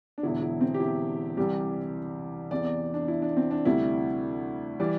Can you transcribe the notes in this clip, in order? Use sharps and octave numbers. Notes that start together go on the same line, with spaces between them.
D4
E1 E2 D3 E4
E4
C4
G4
E4
C2 C3 E3 G3 G4
E2 C3 E3 D5
D5
D4
E4
D4
C4
D4
D2 C3 G3 E4
E3 G3 D5